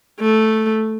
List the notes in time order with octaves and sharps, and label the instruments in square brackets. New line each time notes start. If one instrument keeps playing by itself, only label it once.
[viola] A3